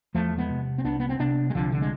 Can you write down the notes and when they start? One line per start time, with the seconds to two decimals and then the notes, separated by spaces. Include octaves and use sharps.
0.14 E2 F3 A3
0.38 G#3 B3
0.50 C3
0.78 C4
0.84 C2 B3 D4
1.00 B3
1.09 C4
1.19 C3 B3 D4
1.50 G#3
1.54 C2 D3 F3
1.72 D3
1.81 G#3